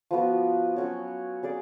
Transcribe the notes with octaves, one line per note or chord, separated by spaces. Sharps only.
F3 B3 F#4
F#3 C#4 F#4 C#5
C#4 G#4 D5